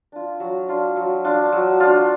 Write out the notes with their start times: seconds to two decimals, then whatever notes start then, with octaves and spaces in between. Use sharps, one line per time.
0.12 D4 F4
0.40 F#3
0.68 D4 F4
0.96 F#3
1.24 D4 F4
1.52 F#3
1.80 D4 F4